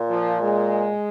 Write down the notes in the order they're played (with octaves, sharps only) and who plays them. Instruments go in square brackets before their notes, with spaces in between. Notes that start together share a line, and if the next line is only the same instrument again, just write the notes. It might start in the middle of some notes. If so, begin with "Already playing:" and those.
Already playing: [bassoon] A#2
[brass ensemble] F3
G#3